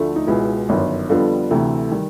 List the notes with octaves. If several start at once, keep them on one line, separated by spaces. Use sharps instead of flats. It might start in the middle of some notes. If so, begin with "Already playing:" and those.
Already playing: D2 D3 F3 A3
D#4
C#2 B2 G#3 B3 E4
G1 F#2 D#3
F2 D3 G3 B3 F4
D2 C3 E3 A3
D#3 G3